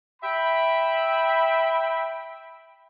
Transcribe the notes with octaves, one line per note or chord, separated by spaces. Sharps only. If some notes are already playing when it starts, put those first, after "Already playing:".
E5 G5 B5